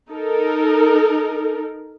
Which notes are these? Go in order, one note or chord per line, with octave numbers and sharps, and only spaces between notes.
D#4 A4 A#4